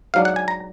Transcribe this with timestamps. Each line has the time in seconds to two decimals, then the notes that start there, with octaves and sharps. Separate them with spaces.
0.14 G#2 F#3 D4 F5
0.25 F#5
0.36 G#5
0.48 A#5